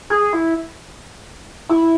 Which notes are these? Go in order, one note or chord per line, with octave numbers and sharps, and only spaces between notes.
G#4
E4
E4